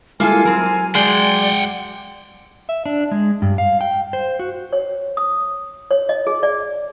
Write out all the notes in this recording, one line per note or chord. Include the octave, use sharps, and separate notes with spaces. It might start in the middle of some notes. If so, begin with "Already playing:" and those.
G3 G#3 A#3 E4 F4 A4 G#5
F#3 C4 A#4
G#3 D5 F#5 G5
E5
D4
G#3
G2
F5
G5
C5
F#4
C#5
D#6
C#5
D#5
G#4
D5